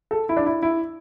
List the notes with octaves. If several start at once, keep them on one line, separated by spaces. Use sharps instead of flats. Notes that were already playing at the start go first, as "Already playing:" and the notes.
A4
E4
D4
E4
E4